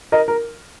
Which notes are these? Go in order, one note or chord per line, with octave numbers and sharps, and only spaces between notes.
A#4 D#5
A#4